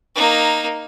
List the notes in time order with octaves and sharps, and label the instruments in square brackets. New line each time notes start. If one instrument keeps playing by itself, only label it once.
[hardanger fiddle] A#3 D#4